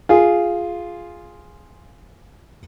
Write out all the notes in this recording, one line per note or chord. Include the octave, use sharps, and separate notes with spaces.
F4 G#4